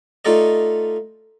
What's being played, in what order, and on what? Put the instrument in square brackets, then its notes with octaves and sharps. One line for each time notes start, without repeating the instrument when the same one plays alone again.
[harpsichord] A3 D#4 F4 A4 D5 D#5